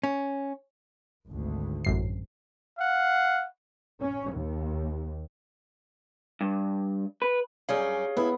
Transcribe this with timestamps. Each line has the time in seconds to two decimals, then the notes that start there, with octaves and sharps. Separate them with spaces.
0.03 C#4
1.28 G#1 D2
1.85 A1 F#2 C7
2.79 F5 F#5
4.01 C#4
4.35 D#2
6.41 G2
7.22 B4
7.69 F#2 G3 C#4 G#4 C#5 F5
8.17 B3 E4 A4